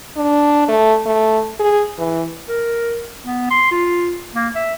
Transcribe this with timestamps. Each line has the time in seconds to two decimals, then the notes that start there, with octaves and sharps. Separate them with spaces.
0.16 D4
0.68 A3
1.06 A3
1.60 G#4
1.98 E3
2.48 A#4
3.24 B3
3.51 C6
3.71 F4
4.35 A#3
4.55 E5